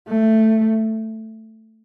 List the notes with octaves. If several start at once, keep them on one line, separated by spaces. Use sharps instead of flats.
A3